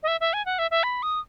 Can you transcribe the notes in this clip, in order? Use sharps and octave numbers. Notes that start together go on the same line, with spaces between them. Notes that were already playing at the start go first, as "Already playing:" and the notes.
D#5
E5
E5
G#5
F#5
E5
E5
B5
D#6